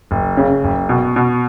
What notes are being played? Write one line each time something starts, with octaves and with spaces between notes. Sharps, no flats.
F#1
C#3
F#1
B2
B2